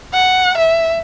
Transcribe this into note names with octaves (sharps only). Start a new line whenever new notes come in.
F#5
E5